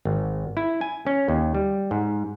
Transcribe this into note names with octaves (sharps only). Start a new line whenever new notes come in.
G#1
E4
G#5
C#4
D#2
G3
G#2